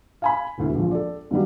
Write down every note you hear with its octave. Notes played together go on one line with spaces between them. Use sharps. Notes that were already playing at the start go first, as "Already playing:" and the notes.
F5 G#5 B5
E1 D2 E4
A#1 F3
A4 D5
G2 D#3 F#3 G3